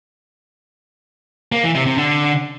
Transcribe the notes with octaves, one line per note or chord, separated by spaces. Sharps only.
A#3
E3
C3
C3
D3